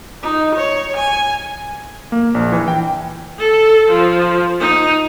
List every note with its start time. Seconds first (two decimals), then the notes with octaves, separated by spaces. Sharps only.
0.23 D#4
0.56 C#5
0.97 G#5
2.12 A#3
2.35 A#1
2.52 E3
2.68 G5
3.39 A4
3.90 F3
4.60 D#4